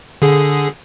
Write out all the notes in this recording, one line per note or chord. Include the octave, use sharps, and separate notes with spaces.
D3 G#4